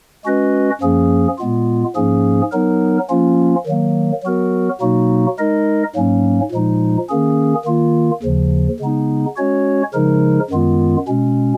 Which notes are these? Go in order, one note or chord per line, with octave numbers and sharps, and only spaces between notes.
G#3 C#4 F#4 B4 D#5
F#2 F3 A#3 C#4 G#4
A#2 G#3 B3 F4
G#2 F3 A#3 C#4 G#4
F#3 B3 D#4 A#4
F3 A#3 C#4 F4
D#3 F#3 A#3
F#3 B3 F#4 A#4
B2 F#3 A#3 D#4 F#4
G#3 D#4 A#4 D#5
G#2 F#3 A#3 C#4
A#2 F3 G#3 D#4
D#3 A#3 C#4 G#4
D#3 A#3 F4
D#2 C#3 F3
C#3 G#3 B3 D#4
G#3 C#4 F#4 C#5
C#3 F3 G#3 D#4 A#4
F#2 D#3 G#3 B3 F4
B2 G#3 C#4